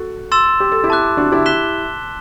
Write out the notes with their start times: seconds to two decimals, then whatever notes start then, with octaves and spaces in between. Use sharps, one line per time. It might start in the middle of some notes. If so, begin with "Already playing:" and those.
Already playing: F#4 A4
0.32 C6 E6 A6 E7
0.60 G4
0.72 A4
0.84 E4 G4
0.90 A5 D6 F#6
1.17 D4 F#4
1.32 E4 G4
1.46 F#6 B6 E7 G7